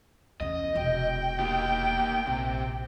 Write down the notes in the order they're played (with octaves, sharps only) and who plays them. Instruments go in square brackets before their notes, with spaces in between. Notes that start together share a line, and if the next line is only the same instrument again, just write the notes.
[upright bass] E2 C#3 [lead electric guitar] D#5
[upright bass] E1 C3 [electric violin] G5
[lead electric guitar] A#3 G4
[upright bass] A#1 [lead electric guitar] C3